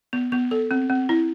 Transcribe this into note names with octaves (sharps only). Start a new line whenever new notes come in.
B3
B3
A4
C4
C4
E4